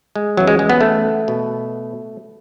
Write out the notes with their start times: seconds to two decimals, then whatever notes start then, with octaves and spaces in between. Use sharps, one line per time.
0.16 G#3
0.37 E2 C#3 E3 F#3
0.47 G#3
0.59 G#3
0.70 B3
0.81 A3
1.28 B2